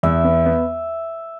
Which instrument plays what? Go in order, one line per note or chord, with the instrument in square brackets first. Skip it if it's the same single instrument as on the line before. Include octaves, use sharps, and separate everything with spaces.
[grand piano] E2 [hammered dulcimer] E5
[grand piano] B3
B3